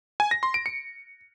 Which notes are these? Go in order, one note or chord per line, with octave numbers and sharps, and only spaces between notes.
G#5
A#6
C6
D7
C#7